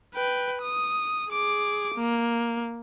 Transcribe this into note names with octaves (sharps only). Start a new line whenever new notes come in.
B4 G5
D#6
G#4 D6
A#3